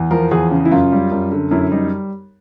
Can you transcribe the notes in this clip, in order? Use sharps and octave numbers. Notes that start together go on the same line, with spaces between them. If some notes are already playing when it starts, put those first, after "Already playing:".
Already playing: E2
F3 A#4
E2 G#4
C#3
E4
F#2 F4
G3
F#2
D3
F#2 E4
G3 D#4